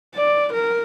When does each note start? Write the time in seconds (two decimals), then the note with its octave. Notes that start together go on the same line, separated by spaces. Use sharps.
0.15 D5
0.54 A#4